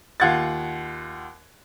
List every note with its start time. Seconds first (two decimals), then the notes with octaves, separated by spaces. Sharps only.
0.20 D#2 F4 F#5 G#6 A6